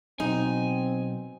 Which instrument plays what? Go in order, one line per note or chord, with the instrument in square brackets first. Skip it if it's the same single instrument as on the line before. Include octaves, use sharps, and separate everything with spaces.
[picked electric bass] B2 F#3 [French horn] C4 [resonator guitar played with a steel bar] D#4 [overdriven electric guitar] G#5